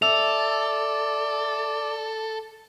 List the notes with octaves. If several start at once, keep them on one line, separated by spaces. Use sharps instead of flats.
A4 D5 E5 E6 F7